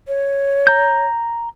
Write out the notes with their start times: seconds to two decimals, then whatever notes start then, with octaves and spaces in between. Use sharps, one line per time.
0.08 C#5
0.67 A#5 G6